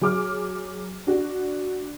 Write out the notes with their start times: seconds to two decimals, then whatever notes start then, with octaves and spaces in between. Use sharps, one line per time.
0.01 F#3 G#4 D6 F6
1.07 D4 F#4